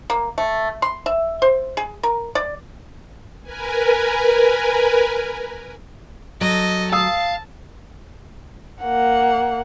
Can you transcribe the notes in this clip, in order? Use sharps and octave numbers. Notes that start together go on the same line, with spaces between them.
A#3
A3
C6
E5
C5
G#4
A#4
D5
A#4 B4 G#5
F#3 A4 D#5
F5 A5 D#6 E6
A#3 F#5